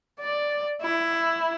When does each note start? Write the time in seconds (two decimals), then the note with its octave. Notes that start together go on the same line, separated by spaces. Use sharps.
0.20 D5
0.81 E4